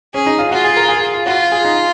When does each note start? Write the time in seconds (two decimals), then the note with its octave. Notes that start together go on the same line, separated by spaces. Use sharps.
0.14 C#4 G#4
0.26 D#4
0.39 F4
0.51 F4 F#4
0.64 G#4
0.76 A#4
0.89 G#4
1.14 F4
1.26 F4 F#4
1.52 G#4
1.65 D#4